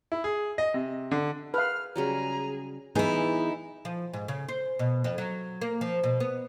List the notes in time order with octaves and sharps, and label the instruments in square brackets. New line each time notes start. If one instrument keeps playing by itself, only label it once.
[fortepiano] E4
G#4
D#5
C3
D3
[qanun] G#4 [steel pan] B4 F5 [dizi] F6
[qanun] C#3 F#3 G3 [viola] G#4 [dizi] A#5
[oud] E3 B3 G#4 [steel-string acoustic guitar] D#4 E4
[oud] F3
G#2
C#3
C5
B2
F2
F#3
A#3
F3
B2
B3